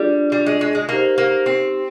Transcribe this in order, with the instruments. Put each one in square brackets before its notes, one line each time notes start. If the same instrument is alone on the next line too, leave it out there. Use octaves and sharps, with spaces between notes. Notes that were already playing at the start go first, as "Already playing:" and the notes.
Already playing: [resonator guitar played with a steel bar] G3 [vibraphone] D4 F4 G#4
[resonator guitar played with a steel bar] G3
G#3
G#3
G#3
[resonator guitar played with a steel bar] A#3 [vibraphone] D#4 G4 C5
[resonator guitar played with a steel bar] A#3
C4